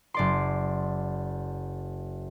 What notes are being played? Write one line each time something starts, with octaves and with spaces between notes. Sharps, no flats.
F#1 D5 C6